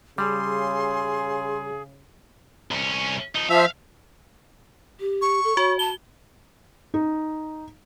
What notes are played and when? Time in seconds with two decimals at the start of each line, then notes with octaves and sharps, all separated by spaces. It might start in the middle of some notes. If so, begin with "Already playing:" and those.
0.18 C#3 G3 G#4 C6
2.71 C2 C#4
3.35 F3 D#4
3.49 F3 E5 F5
5.00 G4
5.22 C#6
5.44 A4
5.57 F#4 C#5
5.79 A5 G7
6.94 D#4